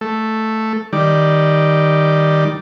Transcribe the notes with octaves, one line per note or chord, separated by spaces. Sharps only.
A3
D#3 G3 D5